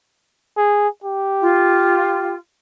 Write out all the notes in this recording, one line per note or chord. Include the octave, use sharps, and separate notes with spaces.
G#4
G4
F4